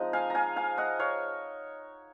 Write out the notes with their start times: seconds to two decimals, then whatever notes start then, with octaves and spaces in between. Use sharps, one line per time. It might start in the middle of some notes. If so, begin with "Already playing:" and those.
Already playing: F3 G#3 C4 D#4 D#5
0.13 F5 G#5
0.30 F5 G#5 A#5
0.56 F5 G#5
0.78 D#5 F#5
0.99 C#5 F5